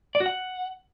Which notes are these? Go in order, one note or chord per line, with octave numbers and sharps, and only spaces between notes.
D5
F#4
F#5